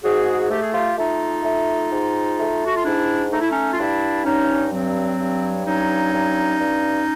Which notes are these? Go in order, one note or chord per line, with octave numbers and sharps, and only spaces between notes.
G#2 F#4 G#4
A3 G4
G#4
F4 G4
A3 D#4 F4
A3
G#2
A3
F#4
F4
G#2 D4 E4
A3 D#4
E4
C#4 D#4
F4
G2 D4 E4
G2 C#4 D#4
F#3 C4
G2
F#3 C#4 D#4
G2
G2